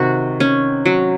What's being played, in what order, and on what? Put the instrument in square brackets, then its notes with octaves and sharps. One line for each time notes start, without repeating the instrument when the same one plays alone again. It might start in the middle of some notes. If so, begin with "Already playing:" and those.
Already playing: [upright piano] C3 D#3 [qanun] F#4
[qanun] C#4
F#3